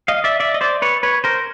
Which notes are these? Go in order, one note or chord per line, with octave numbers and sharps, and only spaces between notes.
D#5 F5
D5 E5
D5 E5
D#5
C5 D5
B4 C#5
B4 C#5
A#4 C5